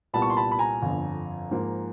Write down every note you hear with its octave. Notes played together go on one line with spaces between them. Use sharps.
C2 A#2 G3 B3 A5 B5
C#6
C6
A5 B5
B5
G#5 A#5
G1 F2 D3
G#2 F3 A#3